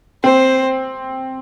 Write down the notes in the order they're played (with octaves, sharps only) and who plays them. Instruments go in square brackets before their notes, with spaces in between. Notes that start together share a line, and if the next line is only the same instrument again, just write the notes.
[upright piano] C4 [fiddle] C5